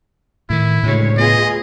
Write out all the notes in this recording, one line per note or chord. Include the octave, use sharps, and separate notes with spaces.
A2 D#3 E4
D2 A2 C#3 G#3 C#5
B3 F4 G#4 D#5